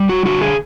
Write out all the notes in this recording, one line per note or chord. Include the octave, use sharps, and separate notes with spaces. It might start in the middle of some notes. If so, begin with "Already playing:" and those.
Already playing: G3
F#4
D3 F#4
G#4